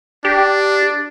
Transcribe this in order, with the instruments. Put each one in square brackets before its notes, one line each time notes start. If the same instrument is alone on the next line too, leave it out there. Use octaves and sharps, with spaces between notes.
[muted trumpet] D4 [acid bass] G4